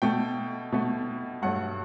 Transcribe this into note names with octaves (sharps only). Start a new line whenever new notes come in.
B2 A3 G5
B2 A3
G2 F#3 A3 F#5